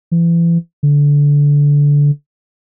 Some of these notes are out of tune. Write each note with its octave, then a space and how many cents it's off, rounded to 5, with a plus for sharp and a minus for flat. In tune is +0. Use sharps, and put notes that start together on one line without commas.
E3 +35
D3 -20